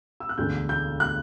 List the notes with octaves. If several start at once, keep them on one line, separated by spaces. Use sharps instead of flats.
E6
F#6
E1 D2 D3 G6
G6
F#6